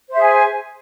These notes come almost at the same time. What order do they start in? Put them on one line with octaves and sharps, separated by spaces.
C5 E5 G#4 G#5